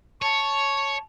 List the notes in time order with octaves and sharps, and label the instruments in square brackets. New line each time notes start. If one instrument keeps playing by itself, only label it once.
[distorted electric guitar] C#5 [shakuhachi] A5 [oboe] C#6